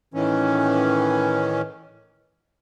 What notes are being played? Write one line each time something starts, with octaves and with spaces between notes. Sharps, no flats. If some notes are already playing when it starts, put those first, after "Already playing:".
A2 D#3 E3 C#4